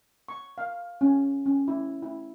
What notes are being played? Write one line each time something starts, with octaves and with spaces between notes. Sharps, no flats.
C#6
F5
C#4
C#4
E4
E4